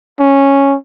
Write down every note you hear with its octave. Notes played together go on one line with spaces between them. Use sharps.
C#4